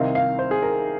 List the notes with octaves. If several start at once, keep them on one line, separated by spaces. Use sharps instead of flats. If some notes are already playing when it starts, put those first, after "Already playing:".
Already playing: C2 C3 D#3 C4 D#4 F5
F5
C5
G#4
A#4